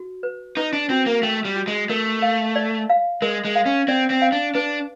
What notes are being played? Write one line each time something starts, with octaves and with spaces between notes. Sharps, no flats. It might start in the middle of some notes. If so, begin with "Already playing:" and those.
Already playing: F#4
B4
D#4 B4
D4
C4 F#4
A#3
A3 G5
G3
F#4
G#3
A3 A#4
F5
D5
F5
G#3 A#4
G#3
F5
C#4
C4 D5
C4
F5
D4
D4 B4